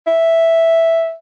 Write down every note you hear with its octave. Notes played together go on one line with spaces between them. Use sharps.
E5